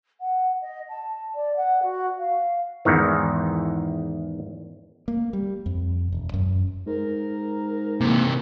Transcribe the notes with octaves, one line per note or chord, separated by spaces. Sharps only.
F#5
D#5
A5
D5
F#5
F#4
F5
E2 G#2 D#3 E3
A#3
G3
F2
E1
F#2
G#2 A#4
C3 E3 A#3